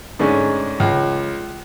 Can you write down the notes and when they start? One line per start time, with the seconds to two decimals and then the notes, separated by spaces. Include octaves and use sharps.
0.19 G#2 D3 G#3 A3 C#4
0.80 C#2